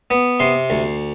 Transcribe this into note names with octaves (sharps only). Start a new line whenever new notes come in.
B3
C3 C6
D2